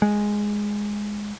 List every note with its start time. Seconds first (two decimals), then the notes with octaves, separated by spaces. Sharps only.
0.02 G#3